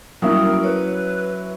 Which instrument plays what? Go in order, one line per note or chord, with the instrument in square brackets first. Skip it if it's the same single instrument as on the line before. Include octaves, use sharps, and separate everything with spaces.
[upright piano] F#3 C#4 E4 [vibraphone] G3 A#3 D#6 [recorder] A#4
[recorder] B4 [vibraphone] C#5